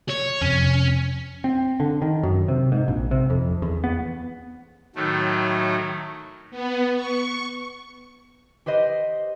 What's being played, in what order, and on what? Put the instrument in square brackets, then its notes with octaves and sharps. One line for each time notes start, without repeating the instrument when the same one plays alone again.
[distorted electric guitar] C#5
[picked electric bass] F2 C3 [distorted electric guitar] C#4
[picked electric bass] C4
D3
D#3
F#2
C3
G#2
A#1
C3
F2
E2
B3
[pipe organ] A2 D#3 F#3 A3
[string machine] B3
C#6
[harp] G4 B4 C5 D#5